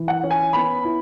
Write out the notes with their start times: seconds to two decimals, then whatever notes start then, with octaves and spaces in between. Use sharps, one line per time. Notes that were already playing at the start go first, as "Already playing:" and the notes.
Already playing: E3 E4
0.08 F#5
0.23 C#4
0.31 G#5
0.53 B3 B5
0.85 E4